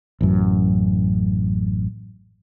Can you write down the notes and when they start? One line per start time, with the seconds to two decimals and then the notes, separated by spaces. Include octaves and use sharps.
0.21 A1 F#2